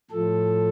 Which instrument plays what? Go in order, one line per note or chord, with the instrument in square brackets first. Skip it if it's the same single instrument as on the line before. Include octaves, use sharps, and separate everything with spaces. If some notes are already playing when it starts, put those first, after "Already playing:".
[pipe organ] A2 F3 A4